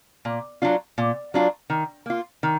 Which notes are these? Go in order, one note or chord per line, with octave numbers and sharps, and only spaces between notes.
A#2
F#3 D4 F4
A#2
F#3 D4 F4
D#3
A#3 F4
D#3